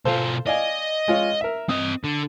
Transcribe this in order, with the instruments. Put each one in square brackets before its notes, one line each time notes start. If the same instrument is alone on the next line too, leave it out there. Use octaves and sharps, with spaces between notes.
[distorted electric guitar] B2 F4 [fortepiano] A4 C5 F5
[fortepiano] D5 F5 G#5 [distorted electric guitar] D#5
[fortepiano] G#3 F4 C#5
A#4 E5
[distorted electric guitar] C4 D#5 [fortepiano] D#6
[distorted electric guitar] D3